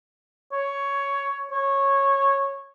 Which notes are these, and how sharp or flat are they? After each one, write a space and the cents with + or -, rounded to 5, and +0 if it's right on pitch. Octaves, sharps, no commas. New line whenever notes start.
C#5 +10
C#5 -10